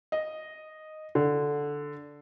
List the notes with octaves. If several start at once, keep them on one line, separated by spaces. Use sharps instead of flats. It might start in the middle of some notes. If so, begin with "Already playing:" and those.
D#5
D3